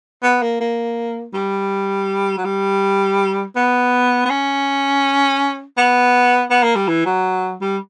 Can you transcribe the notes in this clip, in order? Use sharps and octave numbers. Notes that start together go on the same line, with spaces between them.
B3
A#3
A#3
G3
F#3
G3
B3
B3
C#4
B3
B3
A#3
G3
E3
F#3
G3